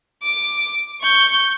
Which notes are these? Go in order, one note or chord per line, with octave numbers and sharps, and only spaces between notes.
D6
C#6 G6